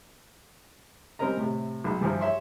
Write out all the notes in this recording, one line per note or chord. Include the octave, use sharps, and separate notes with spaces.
G3 C4 C#4 A#4 D#5 A#5
A2 C3
B1 G#3
G2 E3 F3
C#5 E5 C6